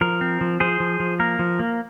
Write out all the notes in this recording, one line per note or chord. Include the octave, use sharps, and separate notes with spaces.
F3 A#4
C4
F3
F3 G#4 C5
F3
F3
A#3 A#4
F3
A#3